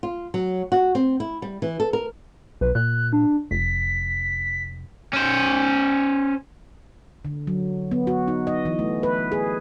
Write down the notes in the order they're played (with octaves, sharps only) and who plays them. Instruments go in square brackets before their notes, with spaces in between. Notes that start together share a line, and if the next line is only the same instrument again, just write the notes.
[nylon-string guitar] F4
F#3
F#4
C4
E4
G3
E3
A4
A#4
[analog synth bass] B1 [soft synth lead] B4
[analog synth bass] A#2 [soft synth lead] F#6
[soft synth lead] D4
[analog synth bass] F1 [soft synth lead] B6
[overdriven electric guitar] C#4 C5
[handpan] D3
F#3
B3
F#4
D#4
D#5
E3
A3
B4
G#4